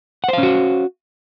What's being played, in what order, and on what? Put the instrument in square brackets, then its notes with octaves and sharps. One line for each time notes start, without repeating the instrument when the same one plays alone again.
[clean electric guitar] F#5
C5
F5
C#4
F#4